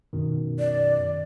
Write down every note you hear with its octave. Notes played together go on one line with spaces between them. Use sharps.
F#2 B2 D#3
D5